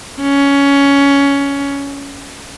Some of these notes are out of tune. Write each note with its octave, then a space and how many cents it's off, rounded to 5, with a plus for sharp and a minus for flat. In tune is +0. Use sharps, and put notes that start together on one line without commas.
C#4 +15